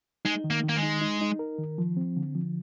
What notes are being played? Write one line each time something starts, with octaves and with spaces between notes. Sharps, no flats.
G#3 D#4
D#3
A#3
D#3
A#3
G#3
D#4
D#4
D#4
A#4
D#3
F3
C4
D3
F3